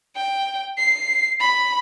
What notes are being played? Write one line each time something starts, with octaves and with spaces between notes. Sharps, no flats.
G5
C7
B5